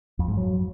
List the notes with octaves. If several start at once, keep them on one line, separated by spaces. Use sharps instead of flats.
F2
G#2
F#3